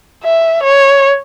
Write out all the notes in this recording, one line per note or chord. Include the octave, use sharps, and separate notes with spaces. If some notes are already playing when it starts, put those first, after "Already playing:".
E5
C#5